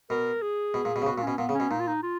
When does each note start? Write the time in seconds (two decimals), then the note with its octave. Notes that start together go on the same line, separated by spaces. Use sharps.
0.10 B2 A#4
0.42 G#4
0.74 B2
0.85 A#2
0.96 B2
1.02 C#3
1.06 B2 F#4
1.18 A#2
1.23 B2 C#4
1.38 A#2 B3
1.49 C#3
1.55 C#4
1.60 B2
1.71 A#2 D#4
1.79 F4
1.87 D#4
2.03 F4